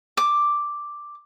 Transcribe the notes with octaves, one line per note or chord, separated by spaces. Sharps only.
D6